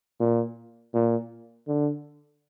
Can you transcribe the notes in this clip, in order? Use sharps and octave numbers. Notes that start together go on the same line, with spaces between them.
A#2
A#2
D3